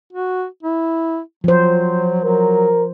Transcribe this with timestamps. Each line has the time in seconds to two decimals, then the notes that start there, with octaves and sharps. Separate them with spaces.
0.13 F#4
0.63 E4
1.44 F3 F#3 C5
2.24 F#3 A#4